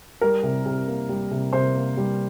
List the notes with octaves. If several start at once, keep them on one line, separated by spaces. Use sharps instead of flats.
G3 A#4
C3
C3
A#3
G3
C3
C3 C5
A#3
G3